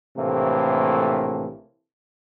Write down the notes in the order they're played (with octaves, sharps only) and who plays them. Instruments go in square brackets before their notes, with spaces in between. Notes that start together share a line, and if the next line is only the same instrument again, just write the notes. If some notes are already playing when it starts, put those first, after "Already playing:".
[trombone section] A#1 A2 C3 E3 A3 A#3